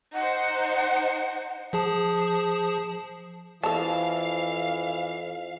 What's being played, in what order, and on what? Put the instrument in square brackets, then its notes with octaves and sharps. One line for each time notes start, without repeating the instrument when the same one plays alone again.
[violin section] D#4 C5 [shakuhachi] F#5
[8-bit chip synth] F3 G#4 A5
[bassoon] F2 [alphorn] E3 [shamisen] A4 A5 [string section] F5